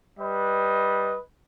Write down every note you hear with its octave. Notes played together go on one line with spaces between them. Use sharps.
G3 B4 D#5